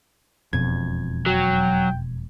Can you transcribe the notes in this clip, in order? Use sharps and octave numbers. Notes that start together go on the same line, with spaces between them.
E1 F2 B2 G#6
F#3 G5